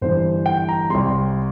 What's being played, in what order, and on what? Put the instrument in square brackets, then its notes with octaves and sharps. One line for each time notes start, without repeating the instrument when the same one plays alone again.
[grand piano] G1 G2 E3 C5
G5
A#5
C2 C3 G3 C6